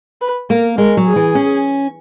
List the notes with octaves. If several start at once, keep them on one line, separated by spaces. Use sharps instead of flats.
B4
A#3 A#4
G#3 A#4
F#3
G#4
E3
C#4